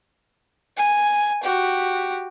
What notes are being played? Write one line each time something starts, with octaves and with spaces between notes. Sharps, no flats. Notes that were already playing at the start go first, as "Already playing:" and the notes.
G#5
F#4 G4